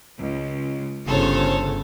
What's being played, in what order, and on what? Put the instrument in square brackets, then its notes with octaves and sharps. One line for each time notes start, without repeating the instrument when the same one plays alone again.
[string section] C#2
[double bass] G1 C#3 [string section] A4 C5 C#5